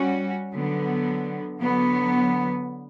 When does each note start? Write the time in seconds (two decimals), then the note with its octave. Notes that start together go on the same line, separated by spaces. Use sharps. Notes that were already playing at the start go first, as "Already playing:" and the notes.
Already playing: G3 C#4 F#4
0.54 D3 F#3 B3
1.61 D3 F#3 B3